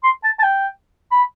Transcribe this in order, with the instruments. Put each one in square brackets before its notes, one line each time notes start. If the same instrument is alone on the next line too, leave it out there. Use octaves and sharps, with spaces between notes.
[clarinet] C6
A5
A5
G5
B5